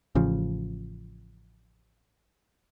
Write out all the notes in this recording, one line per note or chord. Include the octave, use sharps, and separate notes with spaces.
A1 C#3 F3